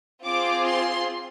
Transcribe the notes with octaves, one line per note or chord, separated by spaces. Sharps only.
C4 F4 G#4 D6
C6